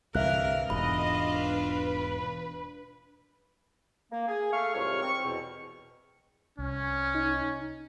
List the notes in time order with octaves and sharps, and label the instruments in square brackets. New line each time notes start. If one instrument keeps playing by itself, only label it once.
[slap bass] C2 G2 D3 [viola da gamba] E3 A#4 [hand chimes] E5 F5 F#6
[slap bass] E1 G#2 B2 [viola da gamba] D4 F4 [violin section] D#5 [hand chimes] B5
[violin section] B4
[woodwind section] A#3
G#4
A3 F5 C#6
C2 F2 G#2 C#5 C#6 F6
C4 C#6
E2 B2
[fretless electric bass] C2 [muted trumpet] C#4
[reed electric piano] D#4